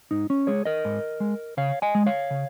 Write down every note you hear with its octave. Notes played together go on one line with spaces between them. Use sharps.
G#2 D#4
C#4
G#3 G#4 C#5
A#4 D#5
G#2
G#3
C#3 C#5 F5
D#5 G#5
G#3
C#5 F5
C#3